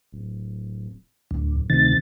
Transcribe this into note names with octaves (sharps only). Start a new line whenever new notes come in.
D1
D1 D2
D2 C3 D#3 A6